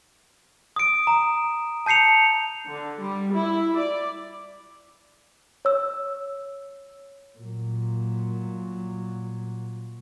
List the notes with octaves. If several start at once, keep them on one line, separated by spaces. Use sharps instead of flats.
D#6 D7
A#5
A5 G6 C7 C#7 F7
D3
G3
E4
D5
C#5 E6
A#2 F#3